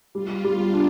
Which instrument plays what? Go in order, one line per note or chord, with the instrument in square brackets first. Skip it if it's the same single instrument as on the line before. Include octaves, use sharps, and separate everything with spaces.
[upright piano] G3 [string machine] F4
[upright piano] G3
[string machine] D4
[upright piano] D4